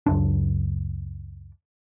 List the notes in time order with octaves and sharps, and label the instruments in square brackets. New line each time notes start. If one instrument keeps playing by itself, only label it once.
[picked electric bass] C#2 F#2 D4